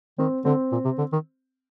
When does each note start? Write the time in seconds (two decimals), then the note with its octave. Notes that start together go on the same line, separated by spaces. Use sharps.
0.18 D#3 C4
0.45 D3 C4
0.72 A#2
0.85 C3
0.98 D3
1.13 D#3